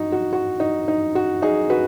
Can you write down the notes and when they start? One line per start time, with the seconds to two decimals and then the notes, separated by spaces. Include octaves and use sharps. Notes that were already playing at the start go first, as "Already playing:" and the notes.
Already playing: D#4 F#4
0.12 F#4
0.33 F#4
0.60 D#4
0.88 D#4
1.15 F#4
1.42 D#4 G#4
1.70 F#4 B4